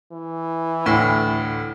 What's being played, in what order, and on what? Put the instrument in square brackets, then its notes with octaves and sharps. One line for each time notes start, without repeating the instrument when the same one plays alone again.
[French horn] E3
[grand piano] D2 A2